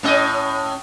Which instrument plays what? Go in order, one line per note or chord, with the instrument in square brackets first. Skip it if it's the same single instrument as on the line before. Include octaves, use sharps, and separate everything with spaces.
[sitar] A2 C#4 D#5